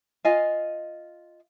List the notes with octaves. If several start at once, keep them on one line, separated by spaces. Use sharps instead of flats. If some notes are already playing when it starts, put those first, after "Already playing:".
F4 D#5 F5 G#5